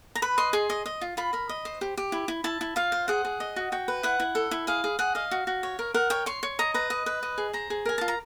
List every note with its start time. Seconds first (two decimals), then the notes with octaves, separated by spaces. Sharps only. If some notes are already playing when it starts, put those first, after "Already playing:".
0.15 A#5
0.22 B4 B5
0.38 D#5 C6
0.53 G#4 C6
0.70 D#5
0.86 D#5
1.01 F4
1.17 F4 B5
1.33 A#4 B5
1.49 D#5
1.65 C5
1.81 G4
1.97 G4
2.12 E4
2.28 E4
2.44 E4 A5
2.61 E4
2.76 F4 F5
2.92 C5
3.08 G#4 F#5
3.25 G#4
3.40 D#5
3.56 F#4
3.72 F#4 G5
3.88 B4
4.03 E4 F#5
4.20 E4
4.35 A4
4.51 E4
4.67 G#4 F5
4.84 G#4
4.99 G#4 F#5
5.15 D#5 F5
5.31 F#4
5.47 F#4
5.63 C#5
5.79 A#4
5.94 A#4 F#5
6.10 C#5 G5
6.26 C#5 C6
6.43 C#5
6.59 D#5 A#5
6.74 B4 A#5
6.90 D#5
7.06 B4
7.23 D#5
7.38 G#4
7.53 C5 A#5
7.70 G#4
7.86 A#4 G#5
7.98 F4 A5
8.08 A#5